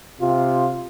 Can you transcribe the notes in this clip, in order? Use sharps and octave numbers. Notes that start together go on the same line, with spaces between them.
C3 F4